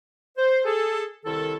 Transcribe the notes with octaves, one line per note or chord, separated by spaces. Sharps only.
C5
G#4 A4
C2 D#3 E4 A4